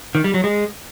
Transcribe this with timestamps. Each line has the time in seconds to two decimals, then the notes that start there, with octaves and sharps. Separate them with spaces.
0.15 D#3
0.24 G3
0.34 F#3
0.44 G#3